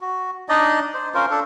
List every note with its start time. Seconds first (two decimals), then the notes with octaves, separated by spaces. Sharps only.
0.01 F#4
0.49 D4 D#4 D5 D#5
0.94 C5
1.14 C#4 F4 A#4 C5
1.31 D4 A4